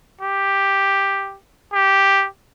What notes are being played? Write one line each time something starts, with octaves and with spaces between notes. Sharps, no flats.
G4
G4